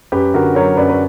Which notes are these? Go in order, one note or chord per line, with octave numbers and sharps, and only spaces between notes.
F#2 G4 B4
D3 F#4 A#4
F#3 A#4 C#5
F#2 B4 D5
B4